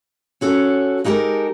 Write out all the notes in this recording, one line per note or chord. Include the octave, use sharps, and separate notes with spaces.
C#4 F#4 A4 C#5
G#3 D#4 G4 A4 A#4